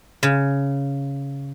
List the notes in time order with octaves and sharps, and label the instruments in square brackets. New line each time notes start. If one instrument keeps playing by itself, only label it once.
[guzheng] C#3